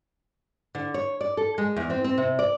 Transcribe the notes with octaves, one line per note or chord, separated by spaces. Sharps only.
D3
C#5
D5
A4
G#3
E2
C4
C4
C3
D5